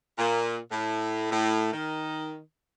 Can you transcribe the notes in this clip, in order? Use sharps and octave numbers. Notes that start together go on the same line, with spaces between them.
A#2
A2
A2
D#3